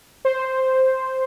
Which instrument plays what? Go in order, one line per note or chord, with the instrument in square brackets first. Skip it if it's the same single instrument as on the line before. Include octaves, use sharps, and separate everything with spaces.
[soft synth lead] C5